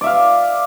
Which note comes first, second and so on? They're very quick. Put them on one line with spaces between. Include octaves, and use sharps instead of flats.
D5 E5 F5